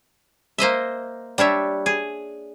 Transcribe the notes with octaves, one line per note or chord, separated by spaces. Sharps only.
A#3 C5 D#5 E5
G3 D4 C#5 E5
G#4